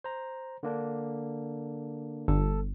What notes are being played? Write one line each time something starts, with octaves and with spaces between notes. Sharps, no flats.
C5 A#5
D3 A#3 D4
G1 A4